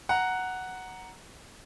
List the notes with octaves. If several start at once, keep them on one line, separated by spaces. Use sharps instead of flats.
F#5 A#5